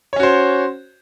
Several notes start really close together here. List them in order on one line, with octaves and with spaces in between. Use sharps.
C#5 C#4 F#4 C5